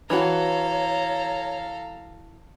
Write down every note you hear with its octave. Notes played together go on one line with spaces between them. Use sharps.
E3 F#4 A4 C#5 F5 A#5